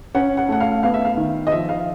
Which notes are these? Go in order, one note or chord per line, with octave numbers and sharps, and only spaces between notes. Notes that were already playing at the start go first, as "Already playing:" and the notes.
C#4 F#5
F#5
A3 F#5
F5
B3 F5
E5
F5
D#3
D#5
F3 E5
F5